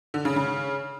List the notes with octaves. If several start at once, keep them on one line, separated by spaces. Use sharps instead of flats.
D3
C#3
C#3